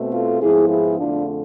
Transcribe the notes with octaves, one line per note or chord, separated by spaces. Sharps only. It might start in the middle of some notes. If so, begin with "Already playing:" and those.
Already playing: B2 A3 C4
F4 A4
G#2 F3 B3 E4 G#4
E4 G#4
F2 D3 A3 D4 F4